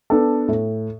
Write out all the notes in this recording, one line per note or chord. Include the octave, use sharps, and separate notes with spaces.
B3 D4 A4
A2